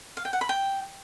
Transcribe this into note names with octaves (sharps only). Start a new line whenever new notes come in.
F5
G5
F#5
B5
G5